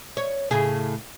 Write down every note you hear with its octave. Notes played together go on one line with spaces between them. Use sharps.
C#5
A2 C#3 G#4